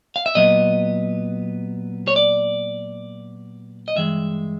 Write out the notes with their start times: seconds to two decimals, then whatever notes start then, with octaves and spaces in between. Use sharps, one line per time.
0.16 F5
0.26 E5
0.35 A#2 F#3 B3 D#5
2.08 C#5
2.16 D5
3.88 D#5
3.96 G2 E3 G#3 E5